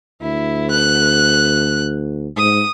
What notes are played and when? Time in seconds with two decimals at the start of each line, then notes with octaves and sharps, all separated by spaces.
0.21 D2 E4
0.71 F#6
2.37 G#2 D#6